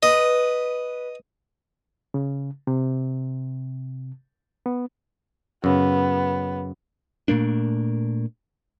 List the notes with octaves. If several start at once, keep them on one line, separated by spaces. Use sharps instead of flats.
B4 D#5
C#3
C3
B3
F#2 C#3 B3
A#2 A3 A#3 D4